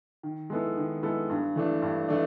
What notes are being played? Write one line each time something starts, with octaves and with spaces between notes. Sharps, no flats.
D#3
G#3 B3 E4 A4
D#3
G#3 B3 E4 A4
G2
E3 A3 D4
G2
E3 A3 D4